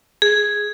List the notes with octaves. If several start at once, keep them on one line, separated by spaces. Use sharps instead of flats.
G#4